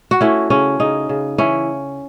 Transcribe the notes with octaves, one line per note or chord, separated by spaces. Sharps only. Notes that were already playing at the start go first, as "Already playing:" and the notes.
F#4
A3 C#4 E4
C#3 C#4
C#3 D#4
C#3
E3 C#4 E4